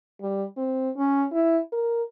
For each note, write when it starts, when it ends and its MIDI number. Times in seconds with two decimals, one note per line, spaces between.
0.21 0.43 55
0.57 0.89 60
0.97 1.25 61
1.32 1.59 64
1.72 2.03 70